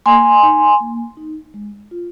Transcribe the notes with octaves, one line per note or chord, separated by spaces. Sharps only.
A#3 G#5 C6
D#4
A#3
D#4
G#3
F4